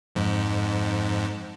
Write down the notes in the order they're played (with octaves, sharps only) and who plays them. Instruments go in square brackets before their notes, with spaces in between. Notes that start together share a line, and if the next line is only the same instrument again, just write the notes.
[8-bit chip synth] F2 G#2